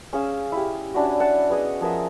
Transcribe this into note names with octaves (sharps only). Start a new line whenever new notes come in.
C#4 G#4 F5 E6
E4 G4
C#4 D4 E4 F#4
F#5 A5
B3 G#4 D#5
F3 G#4 A#4 E5